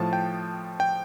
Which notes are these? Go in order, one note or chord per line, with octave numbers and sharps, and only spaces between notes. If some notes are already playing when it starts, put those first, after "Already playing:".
Already playing: A2 F3 A5
G5
G5